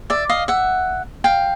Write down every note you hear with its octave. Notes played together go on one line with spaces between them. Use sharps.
D5 E5
D#5 F5
E5 F#5
F5 G5